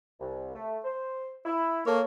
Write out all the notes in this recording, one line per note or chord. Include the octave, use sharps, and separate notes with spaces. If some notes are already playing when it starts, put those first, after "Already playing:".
C2
A3
C5
E4
A#3 A4 C#5